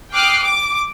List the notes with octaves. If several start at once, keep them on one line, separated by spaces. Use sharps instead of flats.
G5 D6 D#6 F6 F#6 C7
D6